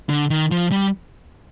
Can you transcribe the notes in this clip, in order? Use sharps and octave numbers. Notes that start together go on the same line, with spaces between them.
D3
D#3
F3
G3